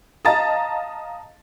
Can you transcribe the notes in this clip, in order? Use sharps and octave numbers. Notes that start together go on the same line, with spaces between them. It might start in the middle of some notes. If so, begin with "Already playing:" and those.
D#5 F5 A5 A#5 A6